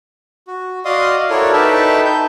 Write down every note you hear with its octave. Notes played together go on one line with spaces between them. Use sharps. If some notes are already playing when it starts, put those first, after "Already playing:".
F#4
F#4 D5 D#5 F5 C6 D#6
E4 F#4 A4 A#4 C#5 D5
D#4 A4 B4 E5 G5 A5
G6